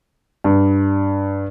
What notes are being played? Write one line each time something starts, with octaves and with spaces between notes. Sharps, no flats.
G2